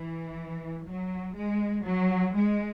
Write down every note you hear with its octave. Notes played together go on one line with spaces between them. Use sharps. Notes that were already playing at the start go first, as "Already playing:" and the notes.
Already playing: E3
F#3
G#3
F#3
G#3